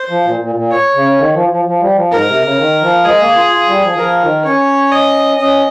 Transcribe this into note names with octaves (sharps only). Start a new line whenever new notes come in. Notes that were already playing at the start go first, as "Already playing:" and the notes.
Already playing: C5
F3
A#2
A#2
A#2
C#5
C#3
D#3
F3
F3
F3
G3
F3
G#2 A#4
C3
C#3
D#3
F3
G#3 G#4
A#3
F4
F4
G3
F3
D#3
F3 A#4
D#3
C#4 C#5
D#5
C#4 D#5